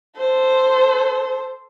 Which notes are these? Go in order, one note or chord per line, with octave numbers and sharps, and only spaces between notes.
A4 C5